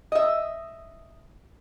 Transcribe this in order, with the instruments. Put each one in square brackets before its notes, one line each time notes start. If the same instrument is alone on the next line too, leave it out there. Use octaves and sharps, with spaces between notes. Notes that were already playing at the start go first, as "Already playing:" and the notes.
[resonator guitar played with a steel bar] D#5 E5